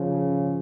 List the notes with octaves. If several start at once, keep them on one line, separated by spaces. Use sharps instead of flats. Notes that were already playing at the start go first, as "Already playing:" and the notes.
Already playing: C#3 F3